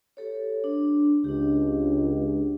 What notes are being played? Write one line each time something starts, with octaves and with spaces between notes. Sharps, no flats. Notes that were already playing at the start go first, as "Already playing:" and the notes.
G4 A4 C#5
D4
C#2 D4 G4